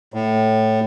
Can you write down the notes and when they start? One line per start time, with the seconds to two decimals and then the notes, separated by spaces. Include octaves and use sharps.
0.14 A2